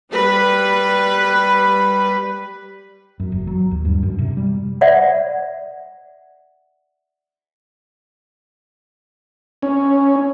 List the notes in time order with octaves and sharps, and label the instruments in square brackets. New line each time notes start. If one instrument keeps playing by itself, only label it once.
[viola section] G3 B4
[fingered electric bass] F#2
F#1
F#3
D#2
G2
F#2
C3
G3
[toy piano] D5 E5 F#5
[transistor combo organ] C#4